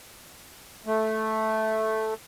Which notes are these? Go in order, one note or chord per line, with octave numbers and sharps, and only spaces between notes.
A3